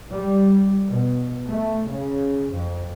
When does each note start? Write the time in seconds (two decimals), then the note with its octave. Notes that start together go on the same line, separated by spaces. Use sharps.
0.11 G3
0.88 B2
1.48 A3
1.89 C#3
2.51 F2